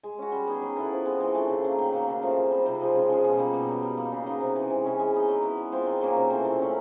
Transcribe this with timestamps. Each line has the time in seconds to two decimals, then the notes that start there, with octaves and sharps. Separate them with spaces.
0.03 G#3
0.19 C#4 F#4
0.32 G3
0.47 B3 D#4 G#4
0.62 F#3
0.76 B3 E4 A4
0.91 F3
1.06 G#3 C4
1.20 E3
1.35 A3 D4
1.50 C#3
1.64 F#3 A#3
1.78 D#3
1.93 F#3 A#3 D#4
2.07 C#3
2.22 F3 A3 C4
2.36 A#2
2.51 G3 C4 D#4
2.66 C3
2.81 F3 G#3
2.95 C#3
3.10 F3 G#3
3.24 B2
3.38 G3 A#3 D#4
3.53 B2
3.68 F#3 B3
3.82 G3
3.97 A#3 D#4
4.12 C#3
4.26 F#3 B3 D#4
4.40 C3
4.56 E3 G#3
4.70 C3
4.84 E3 G#3 C#4
4.99 G#3
5.14 B3 D#4
5.28 F#3
5.42 B3 E4
5.57 G#3
5.72 C4 F4
5.87 D#3
6.01 F#3 A#3 C#4
6.16 C3
6.30 E3 A3 C4
6.45 A#2
6.59 F#3 A3 C#4